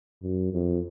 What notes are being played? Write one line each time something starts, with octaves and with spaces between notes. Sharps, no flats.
F#2
F2